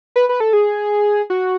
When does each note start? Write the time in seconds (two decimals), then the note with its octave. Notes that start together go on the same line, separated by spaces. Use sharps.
0.16 B4
0.29 B4
0.40 A4
0.53 G#4
1.30 F#4